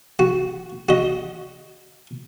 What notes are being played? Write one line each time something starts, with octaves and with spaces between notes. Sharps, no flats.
F#4
F#4 D#5